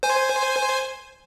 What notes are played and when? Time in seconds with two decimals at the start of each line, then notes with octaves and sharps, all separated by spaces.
0.03 C5 G#5